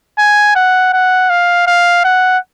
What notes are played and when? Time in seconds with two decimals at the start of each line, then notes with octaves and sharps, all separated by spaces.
0.19 G#5
0.56 F#5
0.93 F#5
1.30 F5
1.67 F5
2.05 F#5